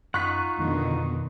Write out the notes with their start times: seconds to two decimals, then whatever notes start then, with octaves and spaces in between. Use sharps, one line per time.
0.14 F#2 D#4 F4 F#5 C#6 F#6 B6
0.59 F2 B2 D3 D#3